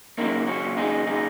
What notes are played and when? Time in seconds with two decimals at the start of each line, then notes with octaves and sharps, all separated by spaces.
0.18 D#2 C#3 F#3 A#3 D#4
0.47 C#4 F#4
0.77 D#4 G#4
1.07 D#4 G#4